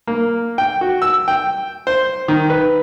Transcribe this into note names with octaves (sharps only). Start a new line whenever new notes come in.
A#3
G5
F#4
E6
G5
C5
D#3
B4